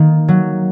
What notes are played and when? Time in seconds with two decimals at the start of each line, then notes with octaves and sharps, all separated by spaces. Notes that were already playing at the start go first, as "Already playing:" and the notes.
Already playing: D#3 A#3
0.28 F#3